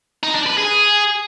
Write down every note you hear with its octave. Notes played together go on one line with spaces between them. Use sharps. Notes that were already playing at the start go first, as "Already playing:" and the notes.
D#4
D4
B4
G#4